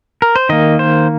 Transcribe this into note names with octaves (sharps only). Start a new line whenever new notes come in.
A#4
C5
D#3 A#3 D#5
C5